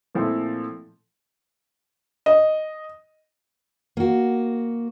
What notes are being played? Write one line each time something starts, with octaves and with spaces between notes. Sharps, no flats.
A#2 F3 A3 C4 E4 A4
D#5
A#3 F#4